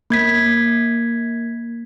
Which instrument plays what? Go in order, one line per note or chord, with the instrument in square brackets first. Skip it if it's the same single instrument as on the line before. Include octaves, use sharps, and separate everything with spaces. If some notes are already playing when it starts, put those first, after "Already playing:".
[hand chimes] A#3 G#6 B6